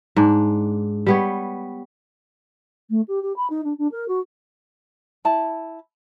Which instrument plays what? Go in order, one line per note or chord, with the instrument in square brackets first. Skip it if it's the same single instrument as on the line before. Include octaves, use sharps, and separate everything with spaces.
[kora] G#2 D4
G3 B3 C#5
[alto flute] A3
G4
G4
B5
D#4
D4
D4
A#4
F#4
[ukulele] E4 A5 B5